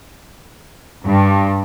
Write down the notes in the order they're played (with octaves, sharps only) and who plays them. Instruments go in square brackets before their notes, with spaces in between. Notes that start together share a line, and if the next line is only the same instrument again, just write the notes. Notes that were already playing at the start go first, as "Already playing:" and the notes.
[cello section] G2